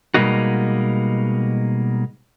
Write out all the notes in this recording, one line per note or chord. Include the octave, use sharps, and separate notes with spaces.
B2 G3 G#3 A#3 D#4 F#4